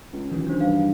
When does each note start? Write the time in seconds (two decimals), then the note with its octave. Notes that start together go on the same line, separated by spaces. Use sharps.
0.13 C#2
0.31 D#3 E3 F#3
0.47 D4 C5
0.60 G2 F5